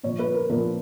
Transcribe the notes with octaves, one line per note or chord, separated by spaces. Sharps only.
A#2 F3 C#5
B4
A#4
A#2 F3 A#4